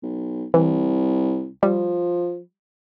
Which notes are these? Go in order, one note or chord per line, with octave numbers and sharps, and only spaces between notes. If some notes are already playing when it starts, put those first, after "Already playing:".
B1
C2 E3
F3 G3